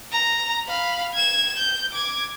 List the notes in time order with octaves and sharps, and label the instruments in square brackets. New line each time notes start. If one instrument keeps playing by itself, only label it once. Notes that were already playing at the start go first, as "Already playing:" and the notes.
[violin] A#5
F5 B5
G#6 E7
G6
D6 G#6